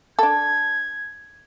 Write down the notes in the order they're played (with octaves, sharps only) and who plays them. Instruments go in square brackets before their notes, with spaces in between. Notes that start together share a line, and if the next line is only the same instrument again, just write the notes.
[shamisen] D4 A4 [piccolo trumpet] G#6